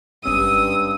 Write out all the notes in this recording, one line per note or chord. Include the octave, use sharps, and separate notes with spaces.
G#1 G2 C#4 D#6 E6 D#7